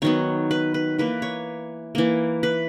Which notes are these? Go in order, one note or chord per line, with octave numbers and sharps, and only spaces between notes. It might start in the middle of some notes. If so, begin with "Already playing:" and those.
D#3 F#3 B3 C#5
B4
B4
E3 A#3 B4
C#5
E3 A#3
B4